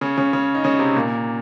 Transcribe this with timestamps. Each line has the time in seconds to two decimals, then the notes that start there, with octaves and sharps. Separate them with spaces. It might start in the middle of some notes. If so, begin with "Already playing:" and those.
0.01 C#3 C#4
0.17 C#3 C#4
0.33 C#3 C#4
0.55 D#4
0.64 C#3 C#4
0.79 C3 C4
0.95 A#2 A#3